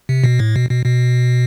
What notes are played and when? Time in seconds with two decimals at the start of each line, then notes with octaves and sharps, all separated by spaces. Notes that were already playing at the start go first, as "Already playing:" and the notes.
0.09 C3
0.24 B2
0.39 A2
0.56 B2
0.71 B2
0.86 B2